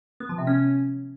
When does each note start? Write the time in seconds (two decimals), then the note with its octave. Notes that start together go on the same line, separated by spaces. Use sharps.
0.20 B3
0.29 F3
0.38 C3
0.47 C#4